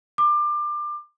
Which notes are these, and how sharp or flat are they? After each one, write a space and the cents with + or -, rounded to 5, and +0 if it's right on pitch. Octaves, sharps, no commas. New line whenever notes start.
D6 +25